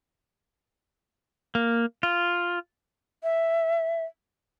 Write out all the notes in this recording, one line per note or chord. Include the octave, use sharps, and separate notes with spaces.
A#3
F4
E5